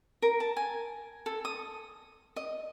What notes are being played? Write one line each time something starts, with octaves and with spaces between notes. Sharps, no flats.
A#4
A5
G#5
A4
D#6
D#5